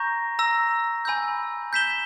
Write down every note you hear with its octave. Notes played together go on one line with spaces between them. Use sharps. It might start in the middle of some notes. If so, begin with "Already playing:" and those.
Already playing: A#5 C#6 G6 A#6
A#5 E6 A#6
G#5 B5 E6 G6
G6 B6 E7 G7